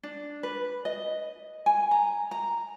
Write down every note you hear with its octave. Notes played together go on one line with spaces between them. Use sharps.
D4
B4
D#5
G#5
A#5
A#5